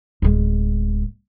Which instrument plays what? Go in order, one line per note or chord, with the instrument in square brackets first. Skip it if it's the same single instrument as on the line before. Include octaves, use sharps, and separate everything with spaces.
[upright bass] D1 G#3